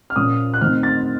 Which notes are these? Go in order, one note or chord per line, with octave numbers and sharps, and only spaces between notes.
F6
A#2 F3 A#3 C#4 D#6
F#6
D#3 A3 C4 F6
A6